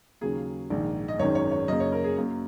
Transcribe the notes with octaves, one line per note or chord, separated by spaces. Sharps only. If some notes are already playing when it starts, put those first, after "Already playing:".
D#2 C#3 F#3 A#3 G#4
A#1 G#2 D#3
D#5
G#1 F#2 D#3 G#3 C#5
C#5
C#5
F#2 C#3 A#3 D#5
C#5
A#4
G#4
F#2 F#3 A#3